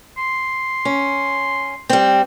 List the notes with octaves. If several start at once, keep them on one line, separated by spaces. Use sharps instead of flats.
C6
C#4
G3 C4